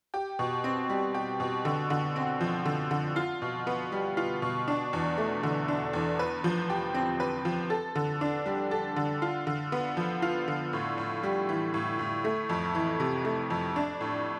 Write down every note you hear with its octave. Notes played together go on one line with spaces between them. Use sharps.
G4
B2
C4
G3
G4
B2
D3
D3
C4
F3
D3
D3
F4
B2
B3
G3
F4
B2
D4
E2
A3
D3
D4
E2
B4
F3
G4
C4
B4
F3
A4
D3
D4
G3
A4
D3
F4
D3
B3
F3
F4
D3
A2
A2
G3
E3
A2
A2
A3
F2
E3
C3
A3
F2
D4
A2